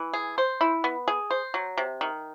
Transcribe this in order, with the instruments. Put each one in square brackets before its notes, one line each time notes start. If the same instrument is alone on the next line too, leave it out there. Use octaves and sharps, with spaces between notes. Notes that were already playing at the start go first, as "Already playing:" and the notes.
Already playing: [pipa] E3
G#4
C5
E4
B3
G#4
C5
F#3
C3
D#3